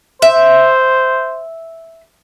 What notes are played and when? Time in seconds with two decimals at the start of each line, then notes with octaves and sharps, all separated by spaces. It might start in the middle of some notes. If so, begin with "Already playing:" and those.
0.22 C5 E5